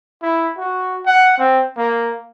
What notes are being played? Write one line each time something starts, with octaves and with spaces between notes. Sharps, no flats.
E4
F#4
F#5
C4
A#3